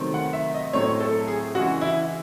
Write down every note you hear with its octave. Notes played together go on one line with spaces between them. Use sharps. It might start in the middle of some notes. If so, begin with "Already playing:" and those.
Already playing: C3 D#3 F#3 A3 C4
F#5
E5
D#5
A2 F#3 A3 C4 C#5
A4
G#4
C#3 E3 G#3 F#4
E4